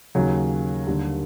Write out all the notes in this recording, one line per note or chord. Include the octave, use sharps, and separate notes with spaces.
D#2 C#3 F#3
D#2 D3 G3 A#3